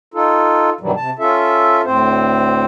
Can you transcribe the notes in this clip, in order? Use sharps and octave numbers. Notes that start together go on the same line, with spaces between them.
D#4 F4 A4
G2 B2 D#3 E3 F#3 G3
C3 A5
C#4 F4 A4 E5
D2 A2 C4 C5